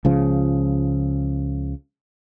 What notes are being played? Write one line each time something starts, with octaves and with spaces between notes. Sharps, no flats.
C#2 C#3 F3